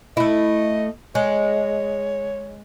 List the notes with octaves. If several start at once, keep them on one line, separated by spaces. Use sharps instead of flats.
A3 E4 D#5
G#3 C#5